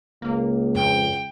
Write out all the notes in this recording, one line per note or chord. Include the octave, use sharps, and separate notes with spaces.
C#2 A#3
F2 G5